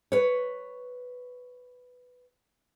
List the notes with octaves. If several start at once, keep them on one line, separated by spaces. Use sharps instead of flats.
B4 C#5